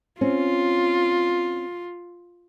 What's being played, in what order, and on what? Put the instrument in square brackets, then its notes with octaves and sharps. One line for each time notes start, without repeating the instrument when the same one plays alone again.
[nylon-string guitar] C4 C#4 [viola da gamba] F4